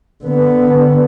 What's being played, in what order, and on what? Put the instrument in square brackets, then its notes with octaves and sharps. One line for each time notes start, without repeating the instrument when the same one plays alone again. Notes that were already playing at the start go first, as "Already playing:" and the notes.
[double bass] D3 B3